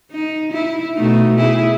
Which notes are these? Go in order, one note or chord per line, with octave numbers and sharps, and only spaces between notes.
D#4
E4
B2 A3 D#4
E4 G#4